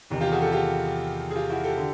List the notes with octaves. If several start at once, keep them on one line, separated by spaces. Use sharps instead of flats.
E2 C3 D#3
F4 G4
F#4 G#4
G4 A4
F4 G4
G#4
F4 G4
E4 F#4
G4 A4
D3